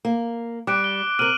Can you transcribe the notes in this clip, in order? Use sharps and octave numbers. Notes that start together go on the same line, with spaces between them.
A#3
G3 D6 F#6 D7
G7
C3 A#4 F6 D#7 F#7